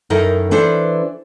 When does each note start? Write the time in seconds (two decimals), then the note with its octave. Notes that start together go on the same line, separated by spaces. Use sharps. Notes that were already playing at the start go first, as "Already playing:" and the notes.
0.10 F#2 D#3 D#4 E4 A4 A#4
0.51 E3 D4 A4 B4 C5